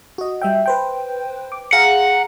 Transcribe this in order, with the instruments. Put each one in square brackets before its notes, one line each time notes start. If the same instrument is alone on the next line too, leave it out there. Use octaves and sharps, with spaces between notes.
[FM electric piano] F#4 D#5
G3 E5 G5
B4 C5 G5
D6
[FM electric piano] G#4 F5 A#5 [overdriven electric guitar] F#5